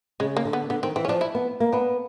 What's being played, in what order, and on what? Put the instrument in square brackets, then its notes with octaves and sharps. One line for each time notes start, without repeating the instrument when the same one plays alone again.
[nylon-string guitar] C#3 [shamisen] G#3
[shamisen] A#3
[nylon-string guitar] D3
[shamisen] B3
[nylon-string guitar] D3 [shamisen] B3
[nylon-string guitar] D#3 [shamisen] C4
[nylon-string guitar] E3 [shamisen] C4
[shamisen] C#4
[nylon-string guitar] F3 [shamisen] D4
[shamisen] E4
[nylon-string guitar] B3
A#3
[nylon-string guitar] B3 [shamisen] D4